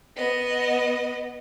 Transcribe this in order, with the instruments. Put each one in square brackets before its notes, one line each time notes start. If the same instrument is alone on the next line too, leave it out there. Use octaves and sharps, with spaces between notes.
[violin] B3 D#5